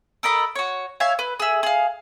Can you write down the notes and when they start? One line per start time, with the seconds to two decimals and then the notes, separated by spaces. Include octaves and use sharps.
0.23 A4 A#4 D#5 B5
0.55 F#4 C#5
1.00 C#5 E5 F5 G#5
1.19 B4
1.40 G#4 E5
1.63 G#4 F5